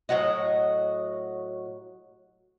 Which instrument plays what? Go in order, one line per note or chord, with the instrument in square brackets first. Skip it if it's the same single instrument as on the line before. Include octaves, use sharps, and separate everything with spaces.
[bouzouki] A2 F#3 F#4 D#5